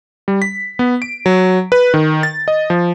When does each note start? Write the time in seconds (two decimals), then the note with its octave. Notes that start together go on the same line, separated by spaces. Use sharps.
0.28 G3
0.42 B6
0.79 B3
1.02 D7
1.26 F#3
1.72 B4
1.94 D#3
2.23 A6
2.48 D#5
2.70 F3